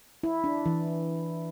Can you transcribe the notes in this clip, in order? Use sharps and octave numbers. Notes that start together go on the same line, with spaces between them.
E4
D4
E3